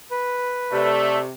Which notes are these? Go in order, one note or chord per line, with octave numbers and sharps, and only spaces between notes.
B4
C3 A3 D5